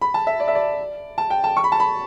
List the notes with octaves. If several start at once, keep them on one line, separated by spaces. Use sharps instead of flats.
B5
A5
E5
D5
E5
D5
A5
G5
A5
C#6
B5
A5
B5